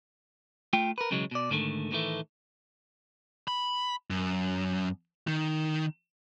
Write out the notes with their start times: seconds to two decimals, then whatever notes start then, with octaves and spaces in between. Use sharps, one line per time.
0.73 A3 F4 G5
0.98 A#4 B4
1.11 B1 C#3 E3 F#3 G#3
1.31 B2 D5
1.50 G#2 D3 D#3 A3
1.91 A2 D#3 E3 A3
3.48 B5
4.10 F#2
5.27 D#3